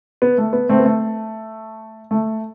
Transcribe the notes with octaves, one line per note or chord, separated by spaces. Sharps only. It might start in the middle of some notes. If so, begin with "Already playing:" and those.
B3
A3
B3
A3 C4
B3
A3
A3